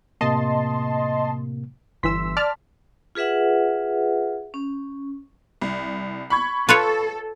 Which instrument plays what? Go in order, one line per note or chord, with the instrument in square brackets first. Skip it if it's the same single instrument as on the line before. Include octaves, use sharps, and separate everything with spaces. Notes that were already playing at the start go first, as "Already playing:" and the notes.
[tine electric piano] A2 C3 A#3 [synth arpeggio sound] D#5 A5 C6
[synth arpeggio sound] G1 E3 E6 [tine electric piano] C6 B6
[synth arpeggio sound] D5 A5 F6
[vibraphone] F4 G#4 B4 E5 F#5
C#4
[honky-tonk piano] C2
B5 C#6 G#6
[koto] F4 B4 C#5 [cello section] A4